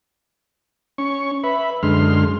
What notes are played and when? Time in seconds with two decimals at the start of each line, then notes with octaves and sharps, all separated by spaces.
0.98 C#4 C#6
1.44 B4 E5 B5
1.83 F#2 D3 G#3 C6 F6